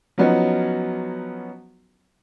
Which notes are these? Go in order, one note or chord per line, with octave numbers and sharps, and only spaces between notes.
F3 F#3 B3 C#4 D#4 F#4